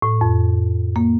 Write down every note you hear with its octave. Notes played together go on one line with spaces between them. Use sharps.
A2
F2
A#3